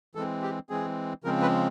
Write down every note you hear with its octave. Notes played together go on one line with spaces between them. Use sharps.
E3 G#3 C4 A4
G4
E3 G#3 C4 G#4
C#3 F3 G#3 C4 A#4
B4